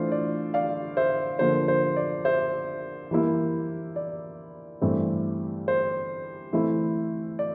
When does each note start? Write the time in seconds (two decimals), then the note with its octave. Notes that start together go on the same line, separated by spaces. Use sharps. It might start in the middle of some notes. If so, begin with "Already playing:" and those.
Already playing: E3 A3 D4 F4 C5
0.12 D5
0.54 D5 F5
0.97 C5 E5
1.39 D3 F3 A#3 C5
1.68 C5
1.96 D5
2.25 C5 E5
3.11 E3 G3 A#3 E4
3.96 D5
4.81 G2 E3 A3 C4
5.68 C5
6.53 E3 A3 C4 E4
7.39 D5